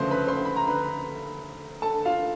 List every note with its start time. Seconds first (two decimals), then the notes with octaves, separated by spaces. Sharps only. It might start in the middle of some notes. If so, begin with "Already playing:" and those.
Already playing: D2 C#3 F3 A3 B4 C5 C6
0.10 B4 B5
0.27 C5 C6
0.45 B5
0.56 A#5
0.68 B4 B5
1.82 A4 A5
2.05 F4 F5